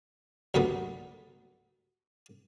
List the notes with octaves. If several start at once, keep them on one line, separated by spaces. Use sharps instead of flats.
C#2 G2 F#3 A3 B3